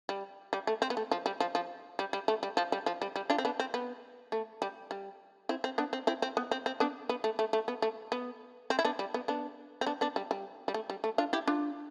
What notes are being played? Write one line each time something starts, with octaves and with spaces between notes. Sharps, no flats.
G3
G3
A3
C4
B3
A3
F3
G3
F3
F3
G3
G3
A3
G3
F3
G3
F3
G3
G3
D4 F4
C4
B3 D4
C4
B3
A3
G3
G3
C4 E4
C4
B3 D4
C4
C4 E4
C4
B3
C4
C4
B3 D4
B3
A3
A3
A3
B3
A3
B3
C4
E4
B3 D4
G3
B3
B3 D4
C4
B3 D4
B3 D4
G3
G3
G3
A3
G3
A3
D4 F4
E4 G4
D4 F4